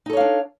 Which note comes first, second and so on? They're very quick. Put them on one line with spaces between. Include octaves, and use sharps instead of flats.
D#4 A4 C#5 F5 D4